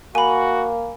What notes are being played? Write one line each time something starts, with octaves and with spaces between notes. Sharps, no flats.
A#3 F#4 G#5 B5